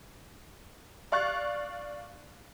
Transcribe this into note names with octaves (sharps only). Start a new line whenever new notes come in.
D5 F5 C#6 F#6 A6